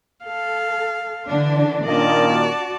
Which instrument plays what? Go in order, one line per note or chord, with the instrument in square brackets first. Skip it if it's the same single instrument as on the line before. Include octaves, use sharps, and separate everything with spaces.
[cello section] A4 [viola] F5
[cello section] D3 E3 D4
[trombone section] A#2 D#3 A#3 [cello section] C#4 D4 D#5 [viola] D5 A5
[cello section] F#4